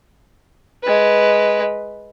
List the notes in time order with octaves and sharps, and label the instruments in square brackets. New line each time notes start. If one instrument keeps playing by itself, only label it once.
[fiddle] G#3 B4